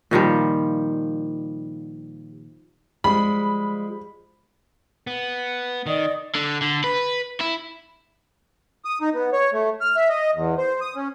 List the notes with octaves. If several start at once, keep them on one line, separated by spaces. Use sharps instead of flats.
A#2 D#3 F3 G3
F3 G3 G#3 B5
B3
D#3 D5 D#5 D#6
D3
D3
B4
E4
D#6
D#4
B3
C#5
A3
F6
E5
D#5
E2
C5
D#6
C#4